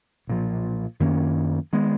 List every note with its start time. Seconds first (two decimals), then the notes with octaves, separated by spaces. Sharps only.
0.27 B1 A#2 F3
1.00 F#2 D#3 A#3 C#4
1.73 D#3 G#3 B3